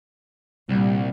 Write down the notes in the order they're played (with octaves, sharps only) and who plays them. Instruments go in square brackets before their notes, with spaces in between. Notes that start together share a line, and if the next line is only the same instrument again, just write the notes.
[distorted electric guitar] C2 [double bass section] A#2 G3